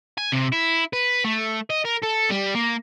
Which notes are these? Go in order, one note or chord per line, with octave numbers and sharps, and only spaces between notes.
G#5
C3
E4
B4
A3
D#5
A#4
A4
G3
A#3